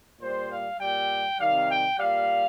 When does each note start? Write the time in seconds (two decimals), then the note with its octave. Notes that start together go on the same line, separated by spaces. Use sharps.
0.21 A#2 G3 C5
0.52 F5
0.80 A#2 G3 G5
1.40 C3 D#3 G3 F5
1.70 G5
1.99 A#2 G3 F5